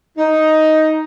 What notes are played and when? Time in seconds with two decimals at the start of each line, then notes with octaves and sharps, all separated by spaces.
0.17 D#4